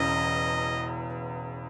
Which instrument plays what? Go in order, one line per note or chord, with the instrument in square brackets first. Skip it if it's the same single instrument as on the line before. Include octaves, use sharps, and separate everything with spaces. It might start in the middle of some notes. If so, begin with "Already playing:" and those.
Already playing: [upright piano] E1 E2 C#3 [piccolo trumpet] D#5